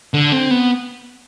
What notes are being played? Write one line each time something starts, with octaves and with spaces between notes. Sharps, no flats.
D3
C4
B3